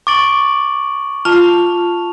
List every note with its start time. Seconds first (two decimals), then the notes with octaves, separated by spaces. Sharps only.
0.07 C#6 D6 A6 D7 F#7
1.25 F4 A5 F7